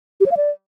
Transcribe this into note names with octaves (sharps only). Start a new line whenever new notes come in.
G4
C#5
F5
D5